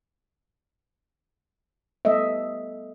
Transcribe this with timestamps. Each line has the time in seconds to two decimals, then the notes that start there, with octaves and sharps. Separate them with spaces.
2.05 G3 A3 B3 A4 D#5 E5